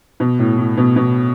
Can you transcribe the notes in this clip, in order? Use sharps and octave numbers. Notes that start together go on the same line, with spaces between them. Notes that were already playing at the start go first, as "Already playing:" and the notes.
B2
A2
A2
B2
B2